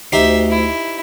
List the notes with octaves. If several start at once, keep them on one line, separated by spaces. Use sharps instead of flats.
D2 D#4 G4 C5 E5
E4